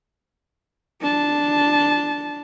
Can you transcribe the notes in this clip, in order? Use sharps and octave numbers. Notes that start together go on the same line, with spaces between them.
D4 A5